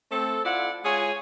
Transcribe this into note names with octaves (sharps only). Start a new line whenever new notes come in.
A3 C4 A4
E4 F4 D5 F#5
G#3 F4 G#4 C#5 G#5